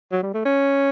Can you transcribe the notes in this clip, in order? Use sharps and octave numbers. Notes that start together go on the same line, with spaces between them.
F#3
G3
A3
C#4